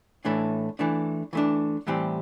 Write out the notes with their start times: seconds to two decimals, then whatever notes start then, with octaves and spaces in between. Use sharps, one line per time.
0.25 A2 E3 A3 D4
0.79 E3 A3 D4
1.33 E3 A3 D4
1.87 A2 E3 G3 C4 G4